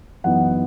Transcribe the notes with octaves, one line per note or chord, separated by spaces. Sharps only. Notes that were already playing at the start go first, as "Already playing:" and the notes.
F#2 E3 B3 D#4 F#5